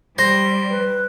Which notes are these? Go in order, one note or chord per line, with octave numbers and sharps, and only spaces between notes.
G3 C5 A#6
B4